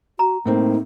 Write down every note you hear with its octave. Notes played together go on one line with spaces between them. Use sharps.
F#4 A#5
A2 A#3 C4 D#4